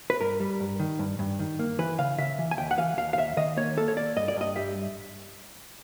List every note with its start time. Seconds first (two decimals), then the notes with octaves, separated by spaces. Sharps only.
0.10 B4
0.21 G2 A#4
0.40 G3
0.60 G2
0.80 D#3
0.99 G2
1.19 G2
1.39 D#3
1.59 A#3
1.79 E3 B4
1.99 C#3 F5
2.18 C#3 E5
2.39 E3
2.51 G#5
2.58 D#2 G5
2.71 F#5
2.78 E3 F5
2.97 D#2 F5
3.13 F5
3.17 D#2 E5
3.37 D#3 D#5
3.57 A#3 C#5
3.77 A#3 A4
3.88 C#5
3.97 A#3 D5
4.16 G2 D#5
4.28 D5
4.37 G2 D#5
4.56 G3 E5